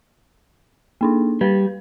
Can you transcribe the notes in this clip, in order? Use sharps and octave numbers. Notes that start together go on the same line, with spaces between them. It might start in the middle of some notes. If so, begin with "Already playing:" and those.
A#3 D4 D#4
G3 B4